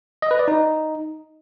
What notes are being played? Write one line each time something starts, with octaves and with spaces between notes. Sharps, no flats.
D#5
B4
D5
D#4